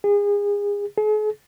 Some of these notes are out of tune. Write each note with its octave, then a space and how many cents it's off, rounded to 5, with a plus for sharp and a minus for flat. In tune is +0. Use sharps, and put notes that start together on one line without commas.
G#4 -30
G#4 +45